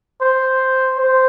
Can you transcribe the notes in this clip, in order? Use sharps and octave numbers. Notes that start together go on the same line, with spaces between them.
C5
C5